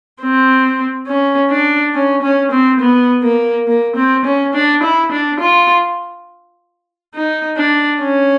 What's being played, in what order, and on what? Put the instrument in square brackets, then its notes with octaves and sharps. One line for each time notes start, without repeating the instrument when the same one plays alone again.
[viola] C4
C#4
D4
C#4
C#4
C4
B3
A#3
A#3
C4
C#4
D4
E4
D4
F4
D#4
D4
C#4